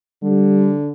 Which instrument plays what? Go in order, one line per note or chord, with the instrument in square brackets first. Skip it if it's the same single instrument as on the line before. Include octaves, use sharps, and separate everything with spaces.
[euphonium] D3 [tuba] G3